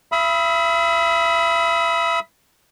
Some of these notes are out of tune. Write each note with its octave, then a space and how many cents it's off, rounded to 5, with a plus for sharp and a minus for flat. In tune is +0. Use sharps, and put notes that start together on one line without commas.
E5 +40 B5 +0 D#6 +45